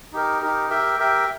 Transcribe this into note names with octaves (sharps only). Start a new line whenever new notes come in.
D#4 G4 A#4
D#4 G4 A#4
G4 A#4 E5 G5
G4 A#4 E5 G5